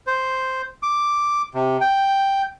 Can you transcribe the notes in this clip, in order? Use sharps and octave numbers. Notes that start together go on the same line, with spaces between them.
C5
D6
C3
G5